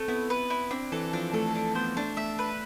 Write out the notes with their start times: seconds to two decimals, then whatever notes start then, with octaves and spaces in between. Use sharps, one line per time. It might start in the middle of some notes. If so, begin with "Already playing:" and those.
Already playing: A3 C4
0.08 B3 E4
0.30 B4
0.50 E4
0.71 C4 D4
0.92 E3 A4
1.13 F3 D4
1.33 A3 A4
1.55 D4
1.75 B3 C5
1.96 A3 D4
2.17 A3 E5
2.39 B4